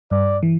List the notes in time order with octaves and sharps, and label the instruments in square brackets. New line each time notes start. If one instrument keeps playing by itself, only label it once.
[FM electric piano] G2 [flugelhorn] D5
[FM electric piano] E3